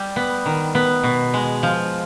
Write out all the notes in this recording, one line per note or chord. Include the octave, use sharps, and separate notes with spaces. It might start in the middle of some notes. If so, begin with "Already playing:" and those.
Already playing: G3
B3
D#3
B3
B2
G#3
F3